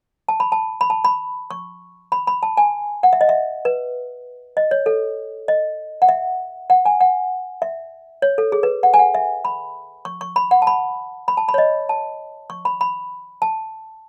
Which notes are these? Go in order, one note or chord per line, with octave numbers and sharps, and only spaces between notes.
A5
B5
A5
B5
A5
B5
C#6
B5
B5
A5
G#5
F#5
E5
D#5
E5
B4
D#5
C#5
A4
D#5
F#5
E5
F#5
G#5
F#5
E5
C#5
A4
G#4
B4
F#5
G#5
F#5
E5
B5
C#6
C#6
B5
F#5
A5
B5
B5
A5
B5
C#5
D#5
A5
C#6
B5
B5
A5